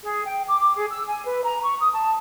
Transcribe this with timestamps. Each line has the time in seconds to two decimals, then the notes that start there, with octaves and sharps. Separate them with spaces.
0.03 G#4
0.26 G5
0.47 D6
0.60 D6
0.76 G#4
0.90 E6
1.07 G#5
1.25 B4
1.44 A#5
1.63 C#6
1.80 D#6
1.93 A5